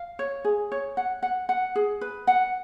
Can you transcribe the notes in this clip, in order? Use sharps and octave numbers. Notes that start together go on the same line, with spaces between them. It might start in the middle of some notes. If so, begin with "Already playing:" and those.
Already playing: F5
C#5
G#4
C#5
F#5
F#5
F#5
G#4
B4
F#5